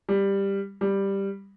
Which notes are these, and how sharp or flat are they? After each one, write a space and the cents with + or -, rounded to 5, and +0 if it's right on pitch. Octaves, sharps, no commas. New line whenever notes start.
G3 +10
G3 +5